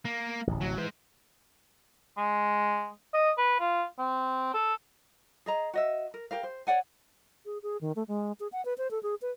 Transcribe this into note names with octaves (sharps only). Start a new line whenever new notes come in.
A#3
D1 A1
F#3
E3 G#3 C5
G#3
D#5
B4
F4
C4
A4
G#4 D#5 A#5
F#4 D#5 E5
A#4
G4 A#4 F5
C5
C#5 D5 F#5 G#5
G#4
G#4
D#3
A3
G#3
G#4
F#5
B4
C5
A4
G#4
B4